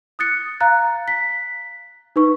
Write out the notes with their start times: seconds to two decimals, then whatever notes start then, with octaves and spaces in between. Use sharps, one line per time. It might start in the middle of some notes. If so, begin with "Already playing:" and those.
0.19 D#6 F#6 A6 C#7
0.60 F5 A#5 F#6 A6
1.08 B6
2.16 D#4 B4 C#6